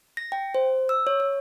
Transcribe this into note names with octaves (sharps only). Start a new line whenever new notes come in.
A#6
G5
C5
E6
C#5
C#5